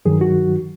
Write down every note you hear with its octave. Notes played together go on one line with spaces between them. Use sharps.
G2 D#3 F#3 G#4
F#4